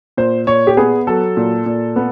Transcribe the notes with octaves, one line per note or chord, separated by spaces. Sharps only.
A#2 C5
A#2 C#5
G4
B3 G#4
F#3 A4
A#2
A#2
B3